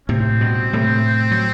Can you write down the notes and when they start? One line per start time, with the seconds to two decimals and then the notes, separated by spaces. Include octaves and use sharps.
0.08 A2 C3 C4
0.41 G2 B2
0.73 A2 C3
1.31 F#3